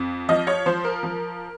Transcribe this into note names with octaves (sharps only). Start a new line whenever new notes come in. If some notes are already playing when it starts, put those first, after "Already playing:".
Already playing: F2
F3 D#5
C#5
F3 C5
A#4
F3